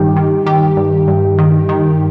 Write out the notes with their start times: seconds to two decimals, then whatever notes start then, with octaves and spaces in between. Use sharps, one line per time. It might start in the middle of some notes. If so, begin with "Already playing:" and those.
Already playing: G2 D#3 G4
0.16 D#3
0.46 D#3 G4
0.77 G2
1.08 G2
1.39 D#3
1.69 D#3